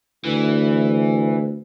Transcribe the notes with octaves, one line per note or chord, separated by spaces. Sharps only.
D2 E3